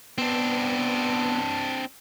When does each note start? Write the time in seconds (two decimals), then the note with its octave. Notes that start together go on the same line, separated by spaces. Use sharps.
0.18 B3 C4 D4